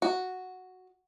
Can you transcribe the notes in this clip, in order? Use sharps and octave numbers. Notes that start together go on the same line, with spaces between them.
F#4